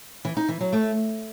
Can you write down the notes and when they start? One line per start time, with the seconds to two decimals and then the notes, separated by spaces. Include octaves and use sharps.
0.25 E3
0.37 D#4
0.49 E3
0.61 F#3
0.73 A3